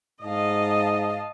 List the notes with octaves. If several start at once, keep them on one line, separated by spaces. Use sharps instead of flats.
G#2 D#5 F5 A5